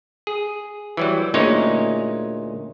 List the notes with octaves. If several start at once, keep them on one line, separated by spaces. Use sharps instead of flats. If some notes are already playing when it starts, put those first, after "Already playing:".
G#4
E3 F#3 G3
D2 A#2 G#3 C#4 D#4 C#5